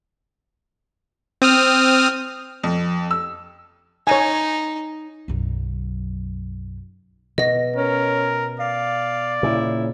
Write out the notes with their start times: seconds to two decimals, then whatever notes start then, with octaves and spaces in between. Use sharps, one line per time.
1.42 C4 D#6 F6
2.64 F2
3.11 E6
4.07 D#4 C#5 G#5
5.28 B1 F#2
7.38 B2 D#5 A#6
7.76 C#4 A#4
8.60 D5 F5
9.43 A#2 C#3 E4